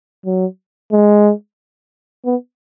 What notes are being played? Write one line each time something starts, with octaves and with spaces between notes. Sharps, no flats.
F#3
G#3
B3